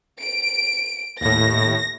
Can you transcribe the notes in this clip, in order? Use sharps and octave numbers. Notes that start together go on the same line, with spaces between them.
D7
D#2 A2 A#6